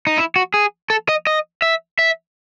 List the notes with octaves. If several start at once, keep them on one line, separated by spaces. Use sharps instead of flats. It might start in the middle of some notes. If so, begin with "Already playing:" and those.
D#4
E4
F#4
G#4
A4
D#5
D#5
E5
E5